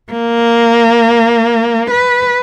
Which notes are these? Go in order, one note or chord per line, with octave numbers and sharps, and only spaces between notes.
A#3
B4